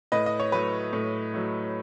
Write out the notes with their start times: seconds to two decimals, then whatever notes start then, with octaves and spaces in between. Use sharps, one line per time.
0.12 A2 B4 D#5
0.26 D#5
0.40 C#5
0.52 F#3 A3 B4
0.93 A2
1.34 F#3 A3